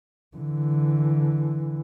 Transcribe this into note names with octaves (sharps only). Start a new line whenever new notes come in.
D3 E3